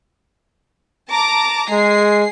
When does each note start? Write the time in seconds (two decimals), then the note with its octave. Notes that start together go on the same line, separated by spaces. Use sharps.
1.11 A5 A#5 D6
1.70 G#3 G#4 C7